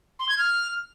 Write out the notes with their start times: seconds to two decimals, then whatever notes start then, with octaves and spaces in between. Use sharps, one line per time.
0.19 C6
0.29 G#6
0.38 F6